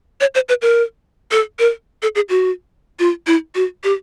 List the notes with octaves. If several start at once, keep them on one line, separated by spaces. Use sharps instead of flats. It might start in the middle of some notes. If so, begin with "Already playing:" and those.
C#5
C5
B4
A#4
A4
A#4
A4
G#4
F#4
F4
E4
F#4
G4